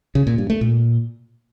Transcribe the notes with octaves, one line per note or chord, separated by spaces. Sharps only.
C#3
A#2
G2
A3
A#2